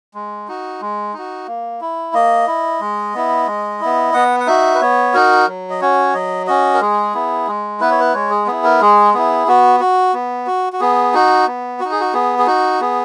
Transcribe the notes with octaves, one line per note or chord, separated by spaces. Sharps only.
G#3
D#4 F#4
G#3
D#4 F#4
A#3
E4
A#3 D#5
E4
G#3
B3 E4
G#3
B3 E4
B3 F#5
F#5
D#4 F#4 E5
B4
B3 C#5
D#4 F#4 A#4
F#3
D#5
C#4 F#4 C#5
F#3 D#5
C#4 F#4 D#5
A#4
G#3 G#4
B3 E4
G#3
B3 E4 B4
C#5
B4
G#3 C#5
G#4
B3 E4 G#4
A#4
G#3 G#4
B3 E4 G#4
B3 F#4
F#4
B3
F#4
F#4
B3 G#4
D#4 F#4
B3
F#4
D#4
G#4
F#4
B3 G#4
G#4
D#4 F#4
B3 G#4